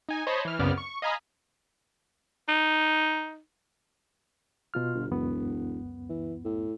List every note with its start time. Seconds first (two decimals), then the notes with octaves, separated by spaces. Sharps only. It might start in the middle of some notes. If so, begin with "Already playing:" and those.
0.09 D#4 G#5
0.27 C5 C#5 D#5 A5 B5
0.45 E3 F6
0.59 C2 F#2 C#3 B3 D5 F6
0.78 C#6
1.02 D#5 F5 G#5 A#5 B5 D#6
2.48 D#4
4.74 B2 F4 F6
4.94 G1
5.11 E1 C#2 F#2 B3
6.10 E3
6.45 A2